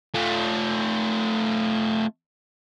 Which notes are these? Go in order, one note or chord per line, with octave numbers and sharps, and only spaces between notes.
A3 F4